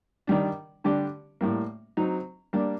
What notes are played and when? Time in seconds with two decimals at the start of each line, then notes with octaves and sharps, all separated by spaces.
0.27 D#3 G3 D4
0.84 D3 G3 D4 G4
1.41 A2 G3 A#3
1.97 F#3 C4 D#4
2.53 G3 A#3 D4